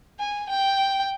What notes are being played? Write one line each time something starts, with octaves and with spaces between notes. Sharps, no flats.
G#5
G5